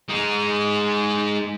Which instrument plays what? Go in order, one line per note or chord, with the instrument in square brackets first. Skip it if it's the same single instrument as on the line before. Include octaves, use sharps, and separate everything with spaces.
[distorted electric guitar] G#3 D#4